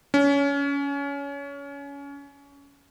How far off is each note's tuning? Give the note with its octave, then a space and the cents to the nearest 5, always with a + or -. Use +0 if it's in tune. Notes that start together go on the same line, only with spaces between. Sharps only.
C#4 +25